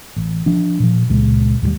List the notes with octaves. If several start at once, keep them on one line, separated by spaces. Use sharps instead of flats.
A1
F3 D4
A#2 F3
C#2 A#2 G#3
D#2 A2 F3 G3